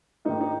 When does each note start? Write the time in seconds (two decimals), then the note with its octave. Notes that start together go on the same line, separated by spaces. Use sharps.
0.25 G#2 D#3 D#4
0.41 D#4